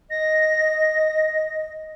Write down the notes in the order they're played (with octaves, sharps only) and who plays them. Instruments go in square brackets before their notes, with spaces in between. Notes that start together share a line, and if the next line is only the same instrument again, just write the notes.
[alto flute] D#5 [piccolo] A#6